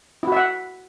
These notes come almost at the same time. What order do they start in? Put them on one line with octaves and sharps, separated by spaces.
E4 F#4 E5 F#5